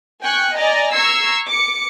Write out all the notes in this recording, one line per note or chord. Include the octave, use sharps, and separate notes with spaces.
G5 G#5 C#6 F#6
D5 D#5 G#5 A#5
A#5 C#6 E6 G#6 C7
D6 C#7